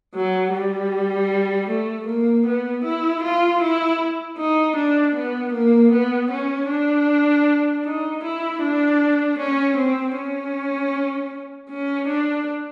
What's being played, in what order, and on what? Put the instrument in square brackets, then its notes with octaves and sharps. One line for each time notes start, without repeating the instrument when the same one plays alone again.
[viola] F#3
G3
A3
A#3
B3
E4
F4
E4
D#4
D4
B3
A#3
B3
C#4
D4
D#4
E4
D4
C#4
C4
C#4
C#4
D4